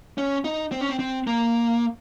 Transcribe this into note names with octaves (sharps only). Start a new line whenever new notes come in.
C#4
D#4
C4
C#4
C4
C4
A#3